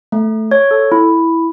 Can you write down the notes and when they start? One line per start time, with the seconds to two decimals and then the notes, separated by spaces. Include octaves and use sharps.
0.12 A3
0.51 C#5
0.71 A4
0.92 E4